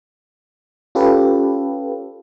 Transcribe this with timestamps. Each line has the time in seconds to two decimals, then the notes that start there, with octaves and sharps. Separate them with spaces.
0.95 C#4 F4 G4 A4 B4